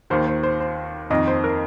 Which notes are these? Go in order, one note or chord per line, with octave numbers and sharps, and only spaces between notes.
D#2 D#3 C5
C5
C5
C5
F2 D#3 D#5
C5
A#4